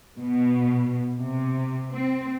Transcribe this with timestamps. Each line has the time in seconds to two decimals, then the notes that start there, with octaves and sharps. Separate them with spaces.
0.19 B2
1.19 C3
1.92 C4